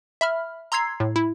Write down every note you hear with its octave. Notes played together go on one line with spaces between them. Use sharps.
E5 B5 F6
A#5 C6 E6 G#6 C7
A2
E4